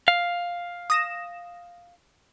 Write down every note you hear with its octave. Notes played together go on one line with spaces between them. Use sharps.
F5
D#6 A#6 E7